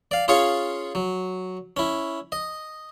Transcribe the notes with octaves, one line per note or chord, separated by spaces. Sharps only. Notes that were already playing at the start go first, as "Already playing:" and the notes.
D5 F5
C#4 F4 G#4 C#5 F5 C#6
F#3
C#4 E4
D#5